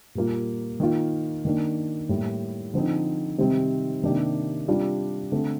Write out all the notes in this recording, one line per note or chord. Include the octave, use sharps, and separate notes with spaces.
A#2 G3 A#3 F4
D#3 A#3 F4
D#3 A#3 D4
A2 G3 A#3
D3 F3 C4 D#4
C3 D#3 G3 C4 D#4
C3 D#3 A#3 D4 G4
C3 G3 D4 F4
D3 A3 C4